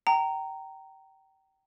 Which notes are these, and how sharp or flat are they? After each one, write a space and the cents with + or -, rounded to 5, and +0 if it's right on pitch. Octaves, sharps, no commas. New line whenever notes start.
G5 -25 A#5 -10